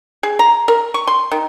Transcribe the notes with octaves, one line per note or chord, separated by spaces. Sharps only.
G#4
A#5
A#4
C#6
C6
D#3